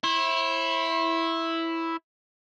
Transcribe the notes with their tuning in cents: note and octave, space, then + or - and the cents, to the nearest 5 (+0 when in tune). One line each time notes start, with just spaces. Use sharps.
E4 +0 C5 +45